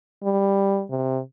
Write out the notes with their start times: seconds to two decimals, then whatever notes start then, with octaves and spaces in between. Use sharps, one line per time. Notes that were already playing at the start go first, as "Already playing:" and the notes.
0.23 G3
0.90 C3